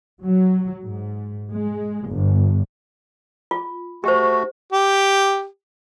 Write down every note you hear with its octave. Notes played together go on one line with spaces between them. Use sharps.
F#3
G#2
G#3
G1
F4
A3 F#4 G4 C5
G4